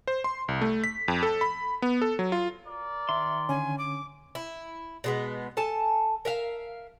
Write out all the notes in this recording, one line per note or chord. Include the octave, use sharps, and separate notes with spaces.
C5
C6
C2
A3
B6
F2
A4
B5
B3
A4
F#3
F4
A#4 D5
D#3 E5 C6
D3 C#4 G#5
D6
E4
B2 G#3 B3
A4 G#5 A5
A#4 E5 F5